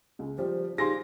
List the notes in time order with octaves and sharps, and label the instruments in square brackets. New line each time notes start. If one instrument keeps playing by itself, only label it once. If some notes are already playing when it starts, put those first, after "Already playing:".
[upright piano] C#2 G#3
[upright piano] F3 G3 [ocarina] C5
[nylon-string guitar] G3 G4 G#4 [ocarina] D#4 [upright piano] F5 C6 A#6